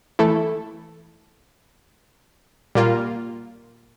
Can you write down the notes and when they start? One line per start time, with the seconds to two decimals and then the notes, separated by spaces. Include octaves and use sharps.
0.19 E3 A3 E4 A4
2.75 A#2 G3 A#3 F4